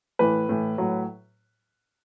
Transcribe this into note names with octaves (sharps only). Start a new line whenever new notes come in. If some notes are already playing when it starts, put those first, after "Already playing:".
A2 E3 B4
A2 E3
A2 F#3